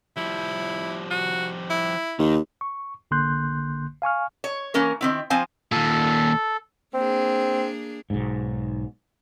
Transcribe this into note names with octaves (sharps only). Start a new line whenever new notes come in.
F3 G3 E4
F#4
E4
D#2 D#3
C#6
A1 D3 A#3 C6 F#6 G6
F5 G#5 C#6 F6
C#5
E3 A#3 C#4 A#4
D#3 C4 E4
F3 C4 C5 F5 G#5
D#2 A#2 A4
A#3 C4 D4 G#4
B1 G#2